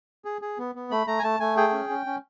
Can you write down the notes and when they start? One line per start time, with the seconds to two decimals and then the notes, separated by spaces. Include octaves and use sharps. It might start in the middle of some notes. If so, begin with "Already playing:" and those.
0.25 G#4
0.42 G#4
0.58 B3
0.75 B3
0.91 A3 B5
1.07 A3 A#5
1.19 G#5
1.23 A3 A5
1.40 A3 G#5
1.57 G#4 G5
1.73 C#4
1.89 C#4
2.06 C#4